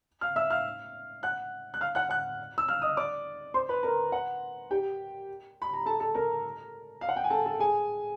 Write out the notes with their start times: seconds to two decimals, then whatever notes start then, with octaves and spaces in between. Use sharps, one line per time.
0.21 F5 F6
0.36 E5 E6
0.50 F5 F6
1.23 F#5 F#6
1.74 F#6
1.81 F5 F6
1.95 F#5 F#6
2.10 F#5 F#6
2.58 E6
2.68 F5 F6
2.82 D#5 D#6
2.97 D5 D6
3.54 C5 C6
3.69 B4 B5
3.83 A#4 A#5
4.12 F#5
4.71 G4 G5
5.62 B5
5.73 A#5
5.86 A4 A5
6.00 A4 A5
6.15 A#4 A#5
7.01 F5
7.09 F#5
7.16 G5
7.24 G#5
7.30 A4 A5
7.46 A4 A5
7.59 G#4 G#5